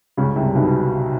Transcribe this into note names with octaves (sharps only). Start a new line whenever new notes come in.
C#2 C#3
C2 C3
B1 B2